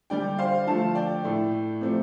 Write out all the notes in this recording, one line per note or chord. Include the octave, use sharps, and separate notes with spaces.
D3 G3 D5 G5
C5 F5
D3 F3 A3 F5 A5
D5 G5
A2 A3
C3 F3 A3